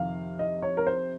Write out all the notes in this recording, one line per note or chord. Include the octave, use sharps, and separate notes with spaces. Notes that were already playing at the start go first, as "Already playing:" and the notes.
Already playing: F2 C3 D#3 F5
D#5
C#5
A#4
C5